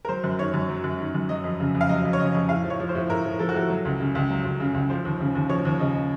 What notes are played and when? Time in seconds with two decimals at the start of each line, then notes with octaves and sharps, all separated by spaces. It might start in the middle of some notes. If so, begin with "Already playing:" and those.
0.05 A#4
0.09 F#3 C5
0.24 F#2
0.39 D#3 C#5
0.54 F#2
0.69 F#3
0.84 F#2
1.00 D#3
1.15 F#2
1.29 F#3 D#5
1.44 F2
1.60 C#3
1.75 F2
1.81 F5
1.89 F#3 D#5
2.05 F2
2.13 C#5
2.19 C#3 D#5
2.34 F2
2.49 A2 F5
2.64 F3
2.70 C#5
2.80 F3
2.89 C5
2.95 A2
3.09 A2 A#4
3.25 F3
3.39 F3 A4
3.49 F#4
3.54 A2 A4
3.70 F#3
3.85 C#2
4.00 C#3
4.15 C#2
4.30 F#3
4.45 C#2
4.60 C#3
4.74 C#2
4.90 F3 C5
5.05 D#2
5.20 C#3
5.35 D#2
5.49 F3 C#5
5.65 D#2
5.79 C#3 D#5